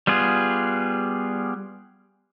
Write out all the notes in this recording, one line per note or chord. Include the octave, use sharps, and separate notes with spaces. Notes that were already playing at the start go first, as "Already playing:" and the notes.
G3 B3 F4 G#4